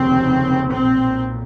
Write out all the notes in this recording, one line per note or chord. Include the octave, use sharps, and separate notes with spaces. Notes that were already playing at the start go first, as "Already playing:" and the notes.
Already playing: F1 D#2 C#3 C4
B1 A#2 C4